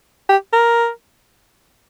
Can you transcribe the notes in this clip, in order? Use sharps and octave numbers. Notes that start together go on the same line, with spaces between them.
G4
A#4